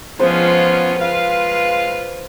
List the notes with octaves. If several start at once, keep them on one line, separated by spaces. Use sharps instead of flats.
F3 G#3 B3 C#4 F4 C5
G#3 F4 B4 F5